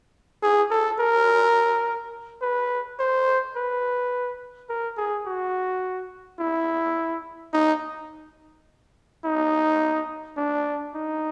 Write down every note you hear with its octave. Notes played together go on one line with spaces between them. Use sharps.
G#4
A4
A#4
B4
C5
B4
A#4
G#4
F#4
E4
D#4
D#4
D4
D#4